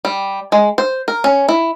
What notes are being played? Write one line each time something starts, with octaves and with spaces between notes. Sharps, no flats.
G3
G#3
C5
A#4
C#4
E4